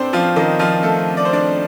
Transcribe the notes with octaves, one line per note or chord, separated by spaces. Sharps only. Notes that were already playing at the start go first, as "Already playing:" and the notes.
Already playing: A2 C4 D4 C5 D5
F3 F4
D#3 D#4
F3 F4
A3 A4
D5
C5
D4 D5